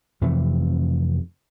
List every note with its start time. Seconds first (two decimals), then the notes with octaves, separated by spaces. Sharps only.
0.21 F2 C3 E3 A3